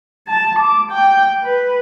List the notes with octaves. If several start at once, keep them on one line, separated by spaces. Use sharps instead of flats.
A5
D6
G5
B4